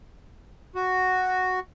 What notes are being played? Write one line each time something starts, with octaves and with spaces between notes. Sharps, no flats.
F#4